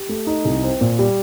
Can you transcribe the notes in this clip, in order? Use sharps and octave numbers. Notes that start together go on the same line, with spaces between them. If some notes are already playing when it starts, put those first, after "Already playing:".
Already playing: G4
A3
D#4
C2
C4
A#2
G3